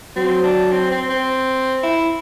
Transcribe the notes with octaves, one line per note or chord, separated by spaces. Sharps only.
F#3 C4
D4
C4
C4
C4
E4